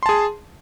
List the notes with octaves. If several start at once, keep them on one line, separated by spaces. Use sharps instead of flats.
G#4 A5 C6